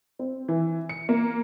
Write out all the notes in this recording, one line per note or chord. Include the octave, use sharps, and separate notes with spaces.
C4
E3
C#7
A#3